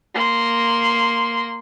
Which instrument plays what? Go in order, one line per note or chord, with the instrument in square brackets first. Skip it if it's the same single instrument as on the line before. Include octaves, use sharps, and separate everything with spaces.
[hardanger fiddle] A#3 C6